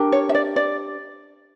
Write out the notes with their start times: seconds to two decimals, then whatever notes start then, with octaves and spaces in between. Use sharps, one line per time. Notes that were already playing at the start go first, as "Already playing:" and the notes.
Already playing: D4 G4 A#4
0.12 C#5
0.29 E5
0.35 D5
0.56 D5